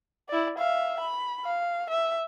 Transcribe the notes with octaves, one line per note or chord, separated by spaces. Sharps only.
E4 D5
E5 F5
B5
F5
E5